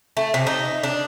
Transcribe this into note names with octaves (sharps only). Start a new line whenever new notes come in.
A3
C3
D#4
D4